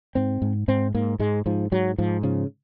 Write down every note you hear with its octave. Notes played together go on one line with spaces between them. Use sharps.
G#2 C4
G#2
G#2 C4
G#2 A#3
G#2 G#3
G#2 F3
G#2 F#3
G#2 F3
C#3 F3